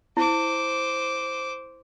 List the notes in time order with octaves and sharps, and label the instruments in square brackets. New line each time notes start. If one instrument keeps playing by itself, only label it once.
[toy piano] E4 [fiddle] C5 D6